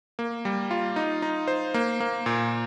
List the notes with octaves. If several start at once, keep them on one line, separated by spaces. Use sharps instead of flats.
A#3
G3
F4
D#4
D#4
C5
A#3
A#3
A#2